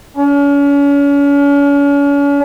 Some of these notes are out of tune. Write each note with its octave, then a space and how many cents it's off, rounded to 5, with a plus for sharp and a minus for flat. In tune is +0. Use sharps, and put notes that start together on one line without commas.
C#4 +40